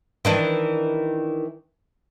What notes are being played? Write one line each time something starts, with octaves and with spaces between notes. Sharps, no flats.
D#3 E3 D4